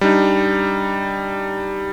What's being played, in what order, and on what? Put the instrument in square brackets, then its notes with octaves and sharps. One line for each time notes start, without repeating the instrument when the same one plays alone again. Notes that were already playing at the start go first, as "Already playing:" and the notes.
[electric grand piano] G3 D4 D#4